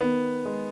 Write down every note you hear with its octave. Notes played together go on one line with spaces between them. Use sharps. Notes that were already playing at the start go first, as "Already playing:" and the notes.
D#3 B3
G#3